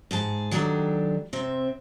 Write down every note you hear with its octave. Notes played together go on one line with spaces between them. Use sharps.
G#2 G#4 A5
D#3 F#3 G3 D4 A4
C3 C4 E5